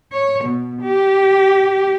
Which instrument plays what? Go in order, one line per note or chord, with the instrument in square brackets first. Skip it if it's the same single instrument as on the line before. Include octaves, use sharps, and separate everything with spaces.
[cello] C#5
B2
G4